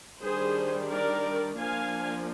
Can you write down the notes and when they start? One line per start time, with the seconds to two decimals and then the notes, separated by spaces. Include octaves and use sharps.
0.22 D#3 G3 D4 G#4 C5
0.90 A#4 D5
1.58 F3 A#3 D4 F5 G#5